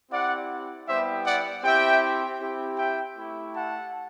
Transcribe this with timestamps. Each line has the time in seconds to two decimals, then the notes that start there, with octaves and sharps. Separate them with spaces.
0.11 C4 E4 G4 D5 F#5
0.88 G3 B3 E4 G4 C5 E5
1.25 D5 F#5
1.63 C4 E4 G4 E5 G5
2.40 C4 E4 G4
2.78 E5 G5
3.16 A3 E4 G4
3.54 F#5 A5